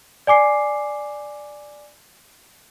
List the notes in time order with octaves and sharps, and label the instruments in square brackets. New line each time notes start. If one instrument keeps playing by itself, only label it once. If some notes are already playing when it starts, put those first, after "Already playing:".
[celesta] D5 G#5 D6 C7